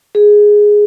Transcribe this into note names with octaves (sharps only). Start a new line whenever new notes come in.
G#4